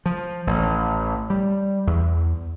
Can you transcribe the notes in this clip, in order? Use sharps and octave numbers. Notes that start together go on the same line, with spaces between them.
F3
A1
G3
E2